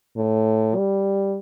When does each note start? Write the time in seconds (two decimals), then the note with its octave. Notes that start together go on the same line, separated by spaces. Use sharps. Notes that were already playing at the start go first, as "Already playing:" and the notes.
0.16 A2
0.76 G3